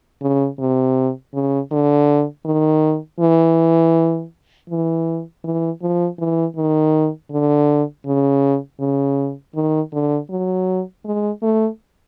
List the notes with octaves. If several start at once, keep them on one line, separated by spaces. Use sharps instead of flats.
C#3
C3
C#3
D3
D#3
E3
E3
E3
F3
E3
D#3
D3
C#3
C#3
D#3
D3
F#3
G#3
A3